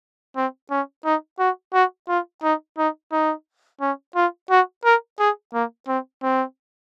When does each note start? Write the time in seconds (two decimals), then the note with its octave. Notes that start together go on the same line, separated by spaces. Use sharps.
0.36 C4
0.71 C#4
1.05 D#4
1.39 F#4
1.73 F#4
2.09 F4
2.43 D#4
2.78 D#4
3.12 D#4
3.81 C#4
4.16 F4
4.50 F#4
4.85 A#4
5.19 G#4
5.54 A#3
5.88 C4
6.23 C4